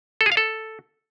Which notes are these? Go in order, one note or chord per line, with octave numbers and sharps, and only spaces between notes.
A4
G#4
F5
A4